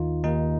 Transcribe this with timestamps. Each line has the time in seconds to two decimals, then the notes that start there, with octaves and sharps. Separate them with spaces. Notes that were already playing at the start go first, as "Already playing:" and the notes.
Already playing: D#2 D#3 D#4 F4
0.24 D#2 D#3 D#4